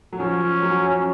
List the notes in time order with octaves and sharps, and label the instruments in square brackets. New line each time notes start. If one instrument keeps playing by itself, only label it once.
[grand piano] F#3
[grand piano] F3 [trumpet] C#4
[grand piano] F#3